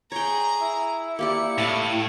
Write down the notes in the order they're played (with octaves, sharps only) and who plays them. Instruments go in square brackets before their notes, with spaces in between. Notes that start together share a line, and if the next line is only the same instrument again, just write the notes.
[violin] G#4 A#5 [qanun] C#5 G5
[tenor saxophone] E4
[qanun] A#3 G4 D5 [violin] C#7
[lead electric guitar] A2 [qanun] F5 A5 B5